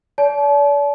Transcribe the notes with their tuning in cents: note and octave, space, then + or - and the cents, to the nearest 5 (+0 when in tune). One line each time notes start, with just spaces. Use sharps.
D5 -40 A5 -35